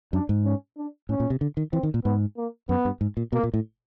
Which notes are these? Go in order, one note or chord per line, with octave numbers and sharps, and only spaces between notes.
F#2 D4
G#2
C#4
D4
A2 C#4
A#2
C3
D3
D#3
E3 C4
D#3
A#2
G#2 B3
A#3
F#2 B3
G2
G#2
A#2
B2 A#3
A#2
A2